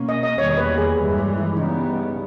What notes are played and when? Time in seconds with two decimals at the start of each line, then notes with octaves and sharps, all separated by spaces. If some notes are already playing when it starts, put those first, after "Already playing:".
Already playing: B2 A#3 C#4
0.09 D#5
0.23 D#5
0.38 E2 D#3 G3 A#3 C#5
0.57 B4
0.78 G#4
0.98 G2 E3 G#3
1.10 G#4
1.18 G4
1.37 E4
1.57 C#3 G3 B3 D#4